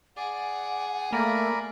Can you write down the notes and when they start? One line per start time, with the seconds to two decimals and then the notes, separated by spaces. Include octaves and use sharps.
0.17 G#4 D5 F#5
1.12 A3 A#3 A#4 D5 B5